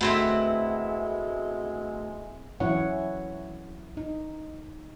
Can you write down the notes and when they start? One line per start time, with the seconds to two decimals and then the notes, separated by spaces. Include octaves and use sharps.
0.01 D2 G#3 B3 C4 E4
2.60 E3 F#3 C#4 E4 C#5 F#5
3.97 D#4